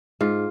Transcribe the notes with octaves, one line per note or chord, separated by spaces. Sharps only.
G#2 F4